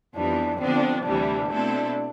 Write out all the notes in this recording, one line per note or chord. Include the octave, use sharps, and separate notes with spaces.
F2 E3 G3 B3 D4
D3 F3 B3 C4 D4
D2 C3 E3 G3 D4
B2 A3 C4 E4 A4